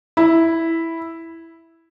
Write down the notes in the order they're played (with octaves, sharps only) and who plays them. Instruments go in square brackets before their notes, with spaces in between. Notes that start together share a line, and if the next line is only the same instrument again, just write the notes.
[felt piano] E4